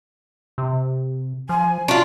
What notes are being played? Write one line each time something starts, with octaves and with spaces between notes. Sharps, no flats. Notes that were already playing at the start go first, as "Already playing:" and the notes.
C3
F3 G#5
D4 F4 F#4